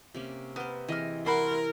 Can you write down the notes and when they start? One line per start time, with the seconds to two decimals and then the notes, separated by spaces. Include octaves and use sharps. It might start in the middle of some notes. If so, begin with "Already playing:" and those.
0.14 C3 A#3 C#4
0.56 B3 A#4 C5
0.88 E3 C4 G#4 D#5 F6
1.26 E4 F#4 A#4 B5 C6